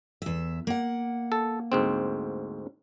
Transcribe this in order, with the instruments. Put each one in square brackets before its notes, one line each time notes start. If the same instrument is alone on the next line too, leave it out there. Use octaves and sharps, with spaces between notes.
[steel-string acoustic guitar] E2 E5
A#3 F#5
[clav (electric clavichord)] A4
D2 G#2 C4